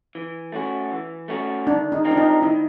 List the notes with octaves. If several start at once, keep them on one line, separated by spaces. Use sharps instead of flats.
E3
A3 C#4 F#4
E3
A3 C#4 F#4
D#3 D4
D#4
G3 C4 F4 A#4
D4
D#4
D#3 E4